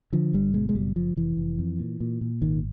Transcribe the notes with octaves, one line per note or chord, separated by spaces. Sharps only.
D3 F3
G1 G3
B2 G#3
G#3
F#1 G3
F#1 F3
F1 E3
F1
F2
A#2
A#2
A#2
G#1 D#3